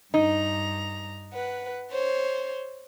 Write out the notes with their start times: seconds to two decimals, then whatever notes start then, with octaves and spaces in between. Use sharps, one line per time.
0.14 G2 D#4 A#5
1.31 B4 F#5
1.91 C5 C#5